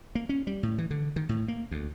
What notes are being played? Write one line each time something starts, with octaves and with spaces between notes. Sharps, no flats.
A#3
C#4
G3
A2
E3
D3
D#3
A2
A#3
D2